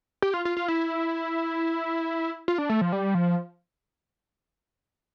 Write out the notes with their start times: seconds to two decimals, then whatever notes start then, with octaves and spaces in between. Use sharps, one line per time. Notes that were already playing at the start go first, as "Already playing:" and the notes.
0.22 G4
0.34 F4
0.45 F4
0.57 F4
0.68 E4
2.48 F4
2.58 D4
2.69 A3
2.81 F3
2.93 G3
3.15 F3